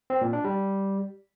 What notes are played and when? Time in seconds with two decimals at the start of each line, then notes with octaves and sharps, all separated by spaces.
0.10 C4
0.22 A#2
0.33 D4
0.45 G3